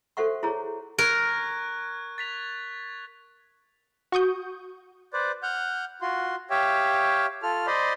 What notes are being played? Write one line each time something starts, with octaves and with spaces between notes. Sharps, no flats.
F#4 A4 C5 E5 F#5 C#6
E4 G#4 C#5 A#5
A#4 C#6 F#6 G#6
A6 B6 F7
F#4 C#6 D#6 G6
B4 C5 D5
F#5 F6 G6
F4 F#4 C6
G4 C#5 E5 F5 G5
F4 A4 F6
C5 D5 D#5 B5 C6